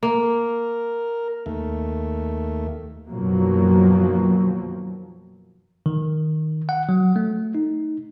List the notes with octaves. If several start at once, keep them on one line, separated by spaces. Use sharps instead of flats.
A#3 A#4
D#2 A3
F#2 B2 D#3 F3 F#3 A#3
D#3
F#5
F#3
A3
D#4